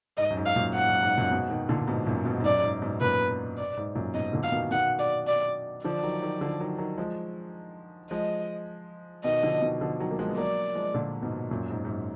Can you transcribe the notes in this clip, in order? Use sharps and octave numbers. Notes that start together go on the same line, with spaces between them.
G#2 D#5
F#2
G#2
F5
F#2 A#2
G#2 F#5
F#2
G#2
F#2 A#2
G#2 B2
B2 D#3
A#2 D3
G#2 B2
F#2 A#2
G#2 B2
G#2
F#2 A#2 D5
G#2
G#2 B2
F#2 A#2 B4
D5
G#2
F#2 A#2
G#2 B2 D#5
A#2 D3
F5
B2 D#3
B2 D#3 F#5
D5
D5
D3 F3 D5
D#3 F#3
D#3 F#3
D3 F3
D#3 F#3
D#3 F#3
F3 G#3
F3 G#3 D#5
B2 D#3 D#5
D3 F3
B2 D#3
D3 F3
D#3 F#3
A#3
F3 G#3
B3
F#3 A#3 D5
F3 G#3
A#2 D3
G#2 B2
F#2 A#2
G#2
G#2
F#2